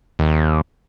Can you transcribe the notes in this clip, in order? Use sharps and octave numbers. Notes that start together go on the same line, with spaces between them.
D#2